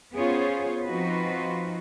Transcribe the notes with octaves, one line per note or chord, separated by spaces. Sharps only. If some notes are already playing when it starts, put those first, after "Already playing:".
B3 C#4 F4 G#4 C5 C#5
F3 C4 D#4 F4 F#4 B4